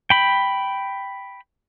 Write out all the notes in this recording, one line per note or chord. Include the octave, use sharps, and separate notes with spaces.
G5 B5